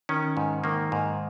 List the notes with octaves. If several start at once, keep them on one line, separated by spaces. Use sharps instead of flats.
D#3 C#4
G#2
D#3 A#3
G#2